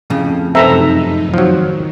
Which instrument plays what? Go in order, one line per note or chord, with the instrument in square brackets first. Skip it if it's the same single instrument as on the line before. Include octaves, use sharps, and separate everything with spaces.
[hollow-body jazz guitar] F2 A2 C#3
[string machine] F#2 C3 D#4 [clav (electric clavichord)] C4 A4 B4 [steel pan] E5 A#5
[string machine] D#3 [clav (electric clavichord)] F3 F#3